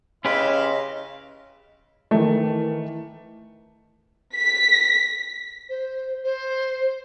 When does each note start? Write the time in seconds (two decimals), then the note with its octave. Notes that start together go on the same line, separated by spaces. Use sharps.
0.25 C#3 C#4 E4 G4 B4 D#5 F5 C6
2.11 D#3 E3 A3
4.36 B6
5.69 C5
6.23 C5